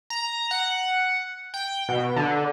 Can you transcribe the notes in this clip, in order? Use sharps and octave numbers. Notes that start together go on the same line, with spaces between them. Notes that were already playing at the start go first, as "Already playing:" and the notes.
A#5
F#5
G5
B2
D3